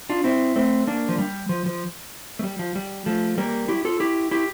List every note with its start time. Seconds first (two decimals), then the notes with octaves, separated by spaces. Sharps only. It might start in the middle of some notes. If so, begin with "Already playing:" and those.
0.09 D4 F4
0.24 C4 E4
0.56 A3 C4
0.87 A#3 D4
1.09 F3
1.19 G3
1.49 F3
1.66 F3
2.39 A3
2.44 G3
2.59 F3
2.75 G3
3.06 F3 A3
3.38 G3 A#3
3.68 E4 G4
3.85 F4 A4
4.00 E4 G4
4.31 E4 G4